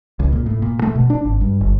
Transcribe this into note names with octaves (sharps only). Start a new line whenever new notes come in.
C#2
A#2
A2
A#2
A3
B2
D4
G#1
G2
G1